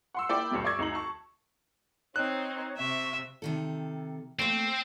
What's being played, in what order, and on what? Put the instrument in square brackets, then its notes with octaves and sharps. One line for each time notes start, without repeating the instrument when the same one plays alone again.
[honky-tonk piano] F#5 C6 E6
A#3 E4 D5 G5
D2 G2 B2
D5 C#6 E6 G#6
D2 D#4 A#5 F#7
A5 C#6
[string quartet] C4 [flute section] D#4 C#5 [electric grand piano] F#6
[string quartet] C3 [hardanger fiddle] E5 [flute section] C#6
[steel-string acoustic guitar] C3 D#3 A4
[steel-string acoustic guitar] A3 A#3 [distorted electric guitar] C4